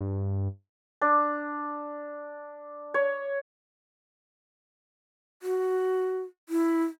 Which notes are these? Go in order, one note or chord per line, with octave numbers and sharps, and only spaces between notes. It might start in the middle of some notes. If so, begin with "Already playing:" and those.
G2
D4
C#5
F#4
E4